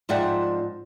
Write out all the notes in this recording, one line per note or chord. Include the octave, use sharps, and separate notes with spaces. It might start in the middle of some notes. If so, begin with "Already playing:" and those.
G#2 F3 C4 D5 E5 F#5